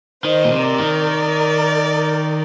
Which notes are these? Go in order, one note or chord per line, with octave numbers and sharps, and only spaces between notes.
D#3 C5 D#5
A#2
C3
A#4 D5
D#3